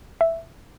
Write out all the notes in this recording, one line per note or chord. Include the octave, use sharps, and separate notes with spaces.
E5